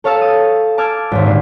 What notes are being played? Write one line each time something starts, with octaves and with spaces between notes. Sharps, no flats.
A4 C#5 F5 A5 E6
D#6
A5 D6 E6 F6 G#6
G#1 D#2
A#2 D3 C6